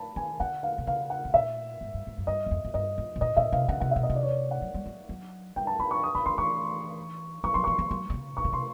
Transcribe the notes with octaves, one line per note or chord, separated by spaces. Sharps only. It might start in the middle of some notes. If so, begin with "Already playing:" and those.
Already playing: A5 B5
D#3 G#5
D3 F#5
F5
C3
C#3 F5
F#5
A2
A#2 E5
G#2
G2
G#2
F#2
G2 D#5
E2
F2
F#2
G2 D#5
F2
B2
A#2 D#5
A#2 E5
C3 F5
C#3 F#5
C3 F#5
B2 E5
D#5
C3
D5
C#5
D5
F#5
F#3
G3
F#3
F#3
G3 G5
A5
F3 B5
C#6
D#6
D3 B5
D#3 C6
E3 C#6
F#3 C#6
F#3 C6
F3 C#6
F3
F#3
D3
C#3
C3 C#6
C#3
C3 C6